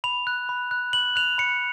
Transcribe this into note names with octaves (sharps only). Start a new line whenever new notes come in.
B5 F7
F#6
B5
F#6
B5 F#7
F#6 F7
B5 C#7